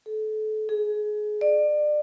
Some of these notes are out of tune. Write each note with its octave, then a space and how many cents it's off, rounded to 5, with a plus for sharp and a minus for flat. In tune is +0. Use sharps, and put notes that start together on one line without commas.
A4 -30
G#4 +25
D5 +30